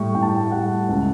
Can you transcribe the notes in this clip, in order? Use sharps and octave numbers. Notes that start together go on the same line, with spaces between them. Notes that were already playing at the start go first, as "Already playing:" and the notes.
Already playing: A2 G3 G5 C#6
A2 G5
A5
G5
G3 F#5
C#2